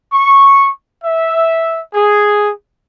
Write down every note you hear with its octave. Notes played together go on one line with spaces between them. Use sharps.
C#6
E5
G#4